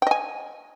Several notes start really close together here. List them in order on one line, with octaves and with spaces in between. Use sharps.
G5 D#5 G#5